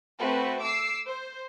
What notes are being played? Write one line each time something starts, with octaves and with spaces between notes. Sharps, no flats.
A3 C4 F#4 B4
D6 E6 C7
C5